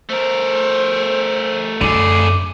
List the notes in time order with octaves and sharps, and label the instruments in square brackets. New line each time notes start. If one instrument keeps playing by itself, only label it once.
[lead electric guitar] A3 A#4 [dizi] C5
[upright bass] F#2 [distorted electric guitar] D3 G#4 [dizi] D6